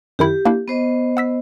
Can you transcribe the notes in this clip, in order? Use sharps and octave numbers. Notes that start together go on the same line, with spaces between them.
F#2 D#3 E4 G4
A#3 D4 E4
B3 C5 D#5
F#5 E6 B6